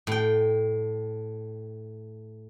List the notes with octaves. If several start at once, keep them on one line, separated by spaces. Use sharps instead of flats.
A2 G5